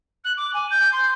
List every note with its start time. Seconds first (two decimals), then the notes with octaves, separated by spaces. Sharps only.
0.24 F#6
0.37 D6
0.53 G#5
0.70 G6
0.92 C6